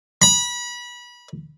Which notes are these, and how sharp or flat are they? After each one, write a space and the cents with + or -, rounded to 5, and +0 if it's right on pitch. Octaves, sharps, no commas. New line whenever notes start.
B5 -30